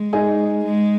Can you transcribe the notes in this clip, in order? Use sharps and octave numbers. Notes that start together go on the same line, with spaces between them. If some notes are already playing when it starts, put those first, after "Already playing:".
Already playing: G#3
D#4 G#4
G#3